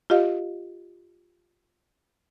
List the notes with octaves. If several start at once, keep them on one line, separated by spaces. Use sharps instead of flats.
F4 G4 D#5 F5